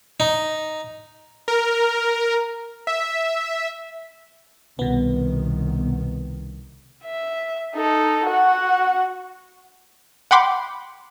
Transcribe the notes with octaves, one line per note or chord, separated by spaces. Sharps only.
D#4
A#4
E5
C2 B2 D#3 B3
E5
D#4 A4
F#4 F#5
F#5 G5 B5 C6 D6